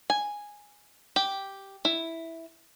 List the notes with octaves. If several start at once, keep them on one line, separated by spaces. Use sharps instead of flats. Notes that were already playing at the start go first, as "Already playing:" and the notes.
G#5
G4
E4